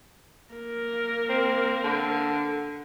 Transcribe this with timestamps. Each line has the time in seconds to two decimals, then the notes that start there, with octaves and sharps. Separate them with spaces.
0.54 A#3 A#4
1.29 C4
1.84 D3